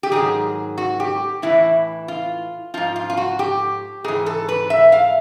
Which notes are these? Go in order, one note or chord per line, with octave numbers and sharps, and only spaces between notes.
G4
G#2 D#3 F#3 G#4
F#4
G4
A2 E3 E4
F4
G#2 F3 F4
F4
F4
F#4
G4
G#2 E3 G#4
A4
B4
E5
F5